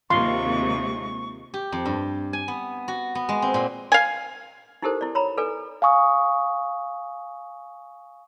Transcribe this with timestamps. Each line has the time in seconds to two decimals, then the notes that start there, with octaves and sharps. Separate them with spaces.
0.10 D#2 C3 G#3 F4 C6 C#6
1.54 G4
1.72 F2
1.85 G2
2.33 G#5
2.48 B3
2.88 F#4
3.15 B3
3.29 G#3
3.42 C4
3.54 A#2
3.92 F5 G#5
4.82 D#4 E4 G4 A4 A#4 C5
5.01 E4 D5
5.15 C#5 A#5 B5
5.37 A4 B4 D5 G#5
5.82 F5 G#5 C#6 D#6